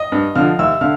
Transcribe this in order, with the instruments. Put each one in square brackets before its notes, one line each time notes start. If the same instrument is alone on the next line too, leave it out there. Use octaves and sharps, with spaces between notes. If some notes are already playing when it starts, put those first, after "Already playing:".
Already playing: [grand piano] D#5 D#6
[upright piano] G2
[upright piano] D3 F3 [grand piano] F5 F6
[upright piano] D#2 [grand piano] E5 E6
[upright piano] D3 [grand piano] F5 F6